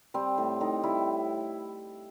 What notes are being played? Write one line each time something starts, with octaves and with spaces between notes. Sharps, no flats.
G3 C4
A2
A2 D#4
G3 E4